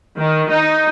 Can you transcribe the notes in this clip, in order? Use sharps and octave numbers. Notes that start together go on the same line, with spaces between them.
D#3
D#4